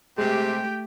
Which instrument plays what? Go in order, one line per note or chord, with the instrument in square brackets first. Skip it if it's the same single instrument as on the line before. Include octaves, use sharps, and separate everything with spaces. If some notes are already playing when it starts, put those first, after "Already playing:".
[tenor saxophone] C3 [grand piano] G#3 [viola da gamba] A3 G4 [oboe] G5